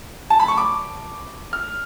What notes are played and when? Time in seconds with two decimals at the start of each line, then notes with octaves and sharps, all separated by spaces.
0.30 A5
0.40 B5
0.48 C#6
0.58 D6
1.53 F6